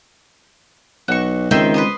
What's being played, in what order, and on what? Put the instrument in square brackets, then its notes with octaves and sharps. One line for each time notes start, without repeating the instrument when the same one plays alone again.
[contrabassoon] B1 [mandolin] F#4 C#6
[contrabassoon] C#2 [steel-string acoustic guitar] D#3 [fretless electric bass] G#3 A#3 C4 [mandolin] E5 G5 C6
[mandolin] B4 C6 D#6